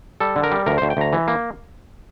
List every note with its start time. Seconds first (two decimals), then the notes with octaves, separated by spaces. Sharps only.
0.20 G3 A4
0.36 D3
0.43 A#4
0.51 G3
0.66 D2 A#4
0.78 D2 C5
0.90 G5
0.97 D2 A#5
1.13 E3
1.28 A#3